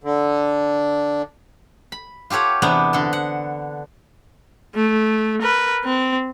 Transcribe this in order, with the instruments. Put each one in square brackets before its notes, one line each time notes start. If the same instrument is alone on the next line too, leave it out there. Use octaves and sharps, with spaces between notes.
[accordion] D3
[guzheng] B5
F4 G4 A4 C#5 F#5
E2 C3 B3 D4 F#5 A#5
D3 A4
F#5
[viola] A3
A#4 B4
C4